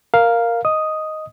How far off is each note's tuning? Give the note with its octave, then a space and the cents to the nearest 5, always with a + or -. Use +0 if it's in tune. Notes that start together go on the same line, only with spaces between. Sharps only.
A#4 +0 F5 +0
D#5 +0 D#6 +0